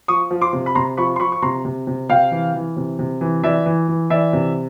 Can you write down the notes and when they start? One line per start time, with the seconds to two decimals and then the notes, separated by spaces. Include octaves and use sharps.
0.08 F3 C#6 D#6
0.31 F3
0.41 C6 D6
0.53 C3
0.66 B5
0.75 C3 A#5 C6
0.97 F3 B5 C#6
1.16 C6
1.20 F3 B5 C#6
1.32 C#6
1.42 C3 A#5 C6
1.65 C3
1.87 C3
2.09 C3 F5 G5
2.31 E3
2.54 E3
2.76 C3
2.99 C3
3.21 E3
3.43 E3 D5 E5
3.66 E3
3.88 E3
4.10 E3 D5 E5
4.33 C3